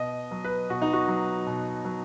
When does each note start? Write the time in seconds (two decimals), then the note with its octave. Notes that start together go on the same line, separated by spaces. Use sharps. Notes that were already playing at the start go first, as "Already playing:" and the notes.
Already playing: B2 D#5
0.31 F#3
0.44 B4
0.69 B2 F#4
0.82 D#4
0.93 F#4
1.08 F#3
1.47 B2
1.85 F#3